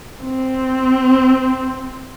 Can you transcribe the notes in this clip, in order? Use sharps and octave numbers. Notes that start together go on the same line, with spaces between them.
C4